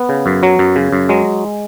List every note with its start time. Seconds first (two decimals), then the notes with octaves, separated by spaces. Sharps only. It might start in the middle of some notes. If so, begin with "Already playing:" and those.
Already playing: B3
0.09 C#3
0.26 F#2
0.43 F#3
0.59 F#2
0.76 C#3
0.92 F#2
1.09 F#3 G#3